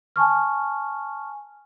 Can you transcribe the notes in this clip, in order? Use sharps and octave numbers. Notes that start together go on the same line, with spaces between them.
G#5 A5 C#6 F6